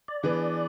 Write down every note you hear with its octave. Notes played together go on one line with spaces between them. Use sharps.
D5
E3 B3 D4 G#4 B4